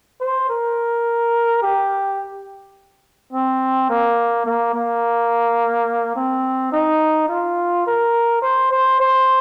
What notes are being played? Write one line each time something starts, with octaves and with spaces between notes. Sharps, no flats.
C5
A#4
G4
C4
A#3
A#3
A#3
C4
D#4
F4
A#4
C5
C5
C5